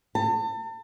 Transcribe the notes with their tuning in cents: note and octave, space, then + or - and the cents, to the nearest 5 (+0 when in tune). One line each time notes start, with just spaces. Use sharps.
A5 +35